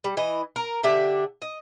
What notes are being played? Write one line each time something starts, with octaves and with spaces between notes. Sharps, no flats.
G3
E3 D#5
A#4
D3 D4 G4 E5
D#5